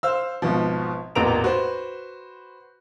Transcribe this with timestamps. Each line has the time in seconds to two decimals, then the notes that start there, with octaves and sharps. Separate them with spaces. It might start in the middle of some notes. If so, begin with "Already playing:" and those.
0.03 C5 F5 E6
0.42 G#1 B2 F3
1.15 A1 E2 A#2 A#5 D7 F7
1.44 F#4 B4 C5